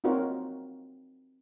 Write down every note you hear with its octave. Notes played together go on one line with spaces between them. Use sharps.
C4 D#4 F4 F#4 A#4 C#5